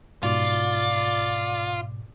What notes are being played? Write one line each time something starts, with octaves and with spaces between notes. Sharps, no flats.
G#2 B2 F4 D5